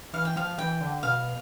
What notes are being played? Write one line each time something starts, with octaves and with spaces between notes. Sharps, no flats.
E3 F5
G5
F3 F5
E3 G5
D3
B2 F5